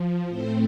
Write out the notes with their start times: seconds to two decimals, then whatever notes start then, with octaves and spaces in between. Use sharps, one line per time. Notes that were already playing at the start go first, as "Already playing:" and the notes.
Already playing: F3
0.27 A2 A3 C4 C5